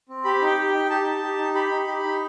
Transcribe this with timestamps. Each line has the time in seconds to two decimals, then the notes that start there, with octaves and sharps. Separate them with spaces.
0.09 C4
0.24 G4 B5
0.41 D#4
0.47 G5
0.58 G4
0.68 G5
0.73 D#4
0.90 G4 A5
1.06 D#4
1.23 G4
1.38 D#4
1.54 G4 B5
1.71 D#4
1.87 G4
2.04 D#4